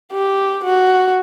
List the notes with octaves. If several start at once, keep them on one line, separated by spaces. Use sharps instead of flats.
G4
F#4